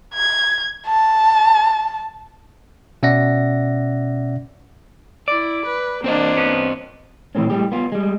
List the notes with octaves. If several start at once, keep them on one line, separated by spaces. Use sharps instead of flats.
G#6
A5
B2 C#4 D5 E5 F#5 A#6
E4 D5
B4
A#3 C4 D4 C5 D#5
B3 C#4
A#2 E3 A3 C4 C#4
A2 G3 G#3 G4
B3 F4
G3 G#3